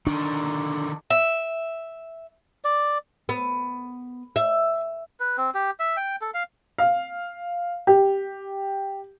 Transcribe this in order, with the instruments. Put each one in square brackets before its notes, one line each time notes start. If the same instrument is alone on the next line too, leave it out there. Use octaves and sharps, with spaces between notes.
[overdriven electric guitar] D3 D#3 [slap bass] D4
[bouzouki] E5
[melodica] D5
[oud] B3
E5
[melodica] B4
C4
G4
E5
G5
A4
F5
[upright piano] F5
G4